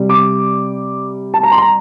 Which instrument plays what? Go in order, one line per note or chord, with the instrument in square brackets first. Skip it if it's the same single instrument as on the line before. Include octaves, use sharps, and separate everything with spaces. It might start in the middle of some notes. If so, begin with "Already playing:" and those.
Already playing: [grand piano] C3 G3
D6
A5
A#5
C6
A#5